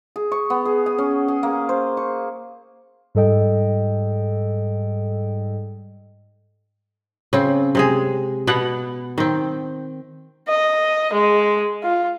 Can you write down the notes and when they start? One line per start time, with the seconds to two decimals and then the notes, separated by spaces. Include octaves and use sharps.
0.16 G#4
0.32 C#6
0.50 B3
0.65 G#4
0.86 G#5
0.98 C#4
1.28 G#4
1.43 A#3
1.69 C5
1.97 C#6
3.15 G#2 G3 A4 D#5 G5
7.33 C#3 C4
7.75 C3 G#3 G#4
8.47 B2 B3 F#5
9.18 D#3 C4
10.48 D#5
11.13 G#3
11.83 F4